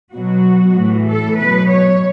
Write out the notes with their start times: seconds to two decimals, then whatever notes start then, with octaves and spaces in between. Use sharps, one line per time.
0.15 B2 F#3 F#4
0.78 A2 E3
1.09 A4
1.39 B2 F#3 B4
1.71 C#5